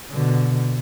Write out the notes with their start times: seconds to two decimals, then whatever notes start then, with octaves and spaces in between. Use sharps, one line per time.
0.11 B2 D3